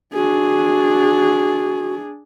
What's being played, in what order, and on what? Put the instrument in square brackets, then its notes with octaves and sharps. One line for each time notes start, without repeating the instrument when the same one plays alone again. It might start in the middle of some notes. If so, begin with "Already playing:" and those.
[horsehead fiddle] D4 G#4 [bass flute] F#4